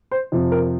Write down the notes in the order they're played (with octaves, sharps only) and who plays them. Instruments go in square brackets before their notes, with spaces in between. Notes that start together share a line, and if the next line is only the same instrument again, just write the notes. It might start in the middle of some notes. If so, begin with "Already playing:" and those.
[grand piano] C5
F2 C3 F3
A#4